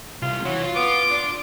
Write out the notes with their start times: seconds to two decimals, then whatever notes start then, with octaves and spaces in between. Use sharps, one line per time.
0.22 C2 F4
0.45 E3 F#3
0.62 F4
0.76 B3 D6
1.10 D4